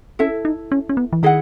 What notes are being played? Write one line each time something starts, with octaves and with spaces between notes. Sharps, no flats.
C#4 E4 A4 E5
D#4
C#4
C#4
B3
E3
D#3 E4 G#4 D#5 F#5